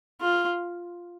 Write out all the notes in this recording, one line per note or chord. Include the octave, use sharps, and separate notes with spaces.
F4